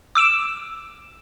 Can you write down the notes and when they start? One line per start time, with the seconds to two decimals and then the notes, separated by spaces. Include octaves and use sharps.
0.15 D6 E6 D7 E7